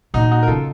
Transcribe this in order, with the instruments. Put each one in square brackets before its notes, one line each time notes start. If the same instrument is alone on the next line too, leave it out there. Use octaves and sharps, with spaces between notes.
[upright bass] A#2 [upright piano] D#4 F#4
[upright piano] D#4 F#4
A#4
[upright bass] C#3 [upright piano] F4 A4